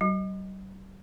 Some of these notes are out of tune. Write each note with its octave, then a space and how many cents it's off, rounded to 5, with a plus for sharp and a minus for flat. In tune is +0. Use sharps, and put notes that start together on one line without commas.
G3 -45